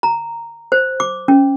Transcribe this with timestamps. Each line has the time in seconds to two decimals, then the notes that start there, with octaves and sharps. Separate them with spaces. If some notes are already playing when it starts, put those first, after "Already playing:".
0.03 A#5
0.72 C5
1.00 D6
1.28 C#4